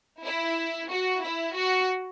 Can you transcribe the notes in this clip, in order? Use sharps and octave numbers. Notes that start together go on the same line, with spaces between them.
E4
F#4
E4
F#4